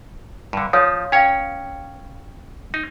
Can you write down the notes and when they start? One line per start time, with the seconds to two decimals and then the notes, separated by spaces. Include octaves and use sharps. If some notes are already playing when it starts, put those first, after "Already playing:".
0.53 G2 D3
0.73 F3 C#5 F5 D#6
1.12 C#4 C#5 F5 G5
2.74 D#4